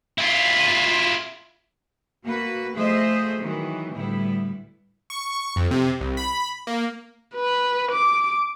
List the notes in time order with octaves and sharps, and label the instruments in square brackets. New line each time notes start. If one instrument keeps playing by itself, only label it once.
[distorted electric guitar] E4 F4
[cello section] A#3 F#4 B4
F3 A3 G#4 C5 D#5 E5
D#3 E3 F#3 G#3
D2 A2 G3 B3 E4
[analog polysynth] C#6
F2
C3
C2
B5
A#3
[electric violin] B4
D6